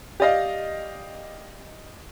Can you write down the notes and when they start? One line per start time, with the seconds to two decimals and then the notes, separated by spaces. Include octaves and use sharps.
0.20 G4 D5 D#5 F5